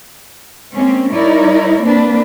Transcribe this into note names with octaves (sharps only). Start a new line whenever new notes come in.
G#3 A#3 C4 C#4
G3 D#4 E4 A#4 C#5 D5
A#3 C4 D4 B4